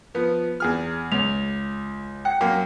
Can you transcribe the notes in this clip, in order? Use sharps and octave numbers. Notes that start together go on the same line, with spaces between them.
F3 B3
E2 G#4 F6
C#2 F7
F#5 G5
F#2 A#3